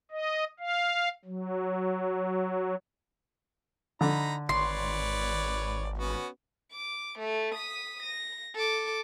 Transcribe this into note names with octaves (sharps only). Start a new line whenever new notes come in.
D#5
F5
F#3
D3 D#4 A#5 B5
G#1 B4 C#5 D5 C6
B3 C#4 F#4
D6
A3
D#6 B6
A#6
A4 D6